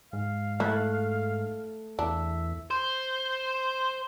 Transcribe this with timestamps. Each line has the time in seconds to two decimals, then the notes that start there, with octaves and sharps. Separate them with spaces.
0.13 G#2 F5
0.60 A3 E4 F#6 A6
1.99 E2 D4 E5
2.70 C5